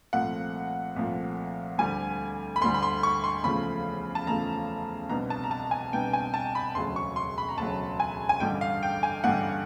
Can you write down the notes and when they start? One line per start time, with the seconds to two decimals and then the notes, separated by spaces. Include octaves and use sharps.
0.13 C2 A#2 F3 A3 F#5
0.96 C2 A#2 F3 A3
1.78 D2 D3 G3 G#5
2.56 B5
2.61 D2 D3 G3 C6
2.74 B5
2.83 C6
3.03 C#6
3.24 C6
3.44 E2 C#3 F3 A3 B5
4.15 A5
4.27 E2 C#3 F3 A3 A#5
5.10 C2 B2 G3 B3 D4 A#5
5.30 A5
5.44 A#5
5.51 A5
5.71 G#5
5.93 C2 B2 G3 B3 D4 G5
6.13 G#5
6.34 A5
6.55 B5
6.75 E1 D2 C#3 F#3 C6
6.96 C#6
7.16 C6
7.38 B5
7.49 A#5
7.58 E1 D2 C#3 F#3 A5
8.00 G#5
8.29 G#5
8.40 A1 G2 D3 G3 G5
8.61 F5
8.83 G5
9.03 G#5
9.24 A1 G2 D3 G3 F#5